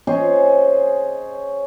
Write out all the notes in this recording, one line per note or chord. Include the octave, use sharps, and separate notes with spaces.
C#4 G#4 C5 D#5